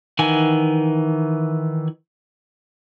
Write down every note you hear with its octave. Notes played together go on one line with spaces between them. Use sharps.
D#3 E3 F#5 G#5